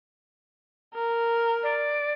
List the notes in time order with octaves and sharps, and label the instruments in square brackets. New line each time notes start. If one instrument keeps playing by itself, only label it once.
[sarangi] A#4
[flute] D5